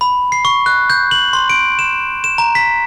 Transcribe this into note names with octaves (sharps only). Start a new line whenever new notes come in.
B5
C7
C#6
F#6
G6
F#7
C6
D7
E7
E7
A#5
B6